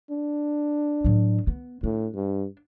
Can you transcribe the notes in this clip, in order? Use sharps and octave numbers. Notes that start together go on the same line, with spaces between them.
D4
A2 F#3
B3
A2 D4
G2